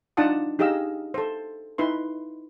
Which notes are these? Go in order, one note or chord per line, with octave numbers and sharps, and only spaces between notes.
D4 D#4 F4 F#5 A5 D#6
D#4 G4 G#4 D#5 F5 E6
A4 C5
D#4 E4 B4 C6